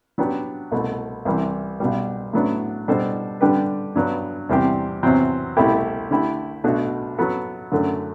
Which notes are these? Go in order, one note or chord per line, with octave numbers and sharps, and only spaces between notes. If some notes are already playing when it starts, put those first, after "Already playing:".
F#3 B3 D4 G4
C2 B2 A3
C2 C3 E3 G3
B1 B2 G3
A2 F#3 B3 D4
B2 G3 D4 A4 C5
D3 G3 D4 G4 B4
G2 F#3 B3
E2 C3 G3 C4 G4
E2 C3 F#3 C4
C2 B2 A3 E4 G4
D3 A3 E4 G4
B1 B2 A3 D4 F#4
F#3 B3 F#4 A4
F#2 D3 F#3 A3